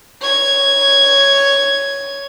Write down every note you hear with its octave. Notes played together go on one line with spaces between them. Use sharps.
C#5 G#6